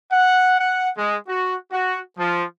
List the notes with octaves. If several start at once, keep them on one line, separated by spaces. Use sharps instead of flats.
F#5
F#5
G#3
F#4
F#4
F3